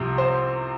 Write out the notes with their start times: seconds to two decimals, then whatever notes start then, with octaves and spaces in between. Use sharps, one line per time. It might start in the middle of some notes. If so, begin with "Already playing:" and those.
Already playing: C2 C3 F3
0.18 C5